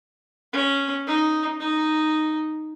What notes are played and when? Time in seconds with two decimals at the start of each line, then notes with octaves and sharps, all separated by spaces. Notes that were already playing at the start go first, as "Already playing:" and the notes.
0.53 C#4
1.07 D#4
1.60 D#4